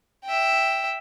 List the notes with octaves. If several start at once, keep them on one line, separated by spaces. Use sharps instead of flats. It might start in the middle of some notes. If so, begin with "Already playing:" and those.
E5 G5